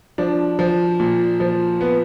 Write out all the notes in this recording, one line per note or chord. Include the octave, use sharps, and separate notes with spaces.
F3 D4
F3
A#2
F3
B3